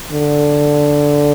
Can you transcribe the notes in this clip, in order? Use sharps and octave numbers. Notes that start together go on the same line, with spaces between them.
D3